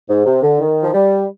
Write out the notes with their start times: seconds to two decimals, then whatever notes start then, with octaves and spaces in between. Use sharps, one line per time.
0.09 G#2
0.26 C3
0.43 D3
0.60 D#3
0.83 F3
0.94 G3